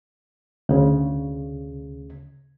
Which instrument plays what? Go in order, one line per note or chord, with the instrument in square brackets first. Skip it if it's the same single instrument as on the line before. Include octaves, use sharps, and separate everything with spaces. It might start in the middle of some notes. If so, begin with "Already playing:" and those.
[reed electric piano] D2 C#3